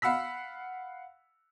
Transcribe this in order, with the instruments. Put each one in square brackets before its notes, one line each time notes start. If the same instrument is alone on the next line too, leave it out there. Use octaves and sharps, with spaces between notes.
[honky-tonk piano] F5 F#5 B5 E6 B6